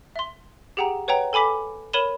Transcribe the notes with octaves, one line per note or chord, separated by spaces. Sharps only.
E5 C6
G4 G#4 F#5 G5 A#5
B4 C#5 F#5 G5 A#5
A4 G#5 B5 D6 B6
A#4 C#5 B5 D#7 E7 G7